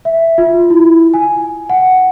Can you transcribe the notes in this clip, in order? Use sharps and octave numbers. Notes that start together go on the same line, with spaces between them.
E5
F4
E4
G#5
F#5